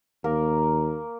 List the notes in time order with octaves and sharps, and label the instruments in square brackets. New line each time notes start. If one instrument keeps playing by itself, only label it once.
[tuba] D#2 [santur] A#3 A#4